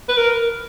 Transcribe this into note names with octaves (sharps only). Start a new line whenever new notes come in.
B4
A#4